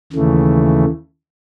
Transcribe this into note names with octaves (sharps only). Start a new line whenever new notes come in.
D#2 C#3 E3 A3